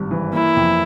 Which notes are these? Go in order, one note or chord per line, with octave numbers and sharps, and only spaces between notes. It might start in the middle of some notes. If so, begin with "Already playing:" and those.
Already playing: G#1 G2 G3
E3
A#3 E4
F2